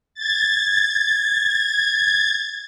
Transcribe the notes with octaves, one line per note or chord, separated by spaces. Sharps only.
G#6 A6